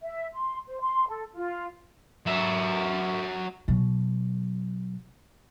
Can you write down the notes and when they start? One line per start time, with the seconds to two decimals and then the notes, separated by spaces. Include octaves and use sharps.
0.02 E5
0.33 C6
0.67 C5
0.81 C6
1.07 A4
1.33 F4
2.26 F#3 E5
3.68 B2 F#3